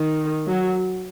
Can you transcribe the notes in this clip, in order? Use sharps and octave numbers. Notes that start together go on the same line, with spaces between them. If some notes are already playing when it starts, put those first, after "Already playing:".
Already playing: D#3
F#3